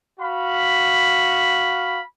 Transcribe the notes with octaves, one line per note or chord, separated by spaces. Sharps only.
F#4 F5 B5